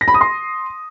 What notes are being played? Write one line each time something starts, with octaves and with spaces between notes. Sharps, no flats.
A#6
B5
D#6
C6